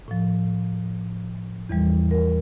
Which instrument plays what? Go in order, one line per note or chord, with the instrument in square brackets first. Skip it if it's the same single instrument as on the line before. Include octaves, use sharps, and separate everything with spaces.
[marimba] A2 F3
E2 E3 G3
A#4